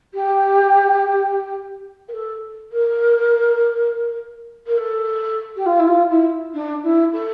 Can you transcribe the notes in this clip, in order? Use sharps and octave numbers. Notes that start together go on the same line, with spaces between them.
G4
A#4
A4
A#4
A#4
A4
G4
F4
E4
F4
E4
D4
E4
A4